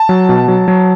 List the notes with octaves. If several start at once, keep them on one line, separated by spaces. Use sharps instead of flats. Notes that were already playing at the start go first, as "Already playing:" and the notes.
Already playing: A5
F#3
B2
F#3
F#3